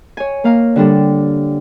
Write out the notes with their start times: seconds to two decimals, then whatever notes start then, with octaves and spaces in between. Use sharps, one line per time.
0.17 C#5 G#5
0.44 A#3 F5 A#5
0.76 D3 G3 D4 A4